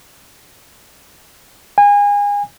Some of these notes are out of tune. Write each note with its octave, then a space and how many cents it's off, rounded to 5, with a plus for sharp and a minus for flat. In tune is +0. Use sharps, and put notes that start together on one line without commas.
G#5 -30